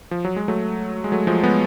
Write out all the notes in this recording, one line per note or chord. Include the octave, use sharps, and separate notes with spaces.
F3
F#3
G#3
F#3 A3
G#3
F#3 A3
F3 G#3
G#3 B3